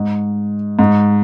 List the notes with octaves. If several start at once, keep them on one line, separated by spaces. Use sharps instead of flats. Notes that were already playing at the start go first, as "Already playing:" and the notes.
Already playing: G#2
G#2